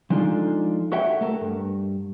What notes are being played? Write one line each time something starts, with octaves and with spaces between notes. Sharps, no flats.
F3 G#3 D4 D#4 F4 A4
F#4 A4 C#5 E5 F#5 G5
A3 A4 A#4
G2